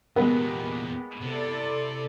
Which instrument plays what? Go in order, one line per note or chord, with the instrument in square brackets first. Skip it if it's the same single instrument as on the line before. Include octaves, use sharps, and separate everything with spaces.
[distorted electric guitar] E2 A#2 [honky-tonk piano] G#3 B3 [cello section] A#3 G4 [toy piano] A#4
[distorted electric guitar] C3 [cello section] E4 A4 D5